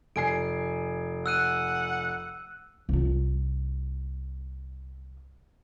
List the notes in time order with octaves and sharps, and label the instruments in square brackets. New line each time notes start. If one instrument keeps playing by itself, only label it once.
[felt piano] F1 G#5 C7 [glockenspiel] D7
[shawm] F#5 [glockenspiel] E6 F#6 D#7
[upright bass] C2 F4